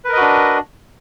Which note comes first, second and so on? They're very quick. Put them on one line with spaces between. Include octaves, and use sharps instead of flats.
B4 A#4 D#5 F#4 D4